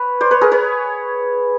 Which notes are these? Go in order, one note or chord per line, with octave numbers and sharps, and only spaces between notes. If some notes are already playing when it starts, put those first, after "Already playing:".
Already playing: B4 C#5
C5 D5
B4 C#5
G#4 A#4
B4 C#5